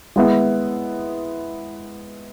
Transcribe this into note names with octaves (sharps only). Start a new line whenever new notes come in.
G#3 B3 E4